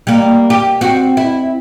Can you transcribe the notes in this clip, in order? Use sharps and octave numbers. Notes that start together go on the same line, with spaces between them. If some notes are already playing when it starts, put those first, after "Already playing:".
G3 A#3
G4
C4 F#4
E4